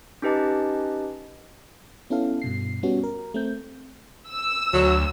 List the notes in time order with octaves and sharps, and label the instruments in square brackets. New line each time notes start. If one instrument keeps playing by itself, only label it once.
[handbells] C#4 D#4 G4 B4 D#5 A5
[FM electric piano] B3 C#4 E4 A4 F5
G2 B2 C7
G3 B3 C#4 F#4
A#4
A3 C4 G6
[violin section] E6
[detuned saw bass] D2 [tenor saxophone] F#3